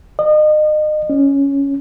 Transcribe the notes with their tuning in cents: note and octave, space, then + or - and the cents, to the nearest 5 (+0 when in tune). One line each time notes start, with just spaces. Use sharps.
D#5 -35
C#4 +5